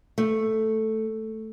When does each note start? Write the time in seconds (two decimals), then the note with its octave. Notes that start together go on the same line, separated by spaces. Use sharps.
0.18 A3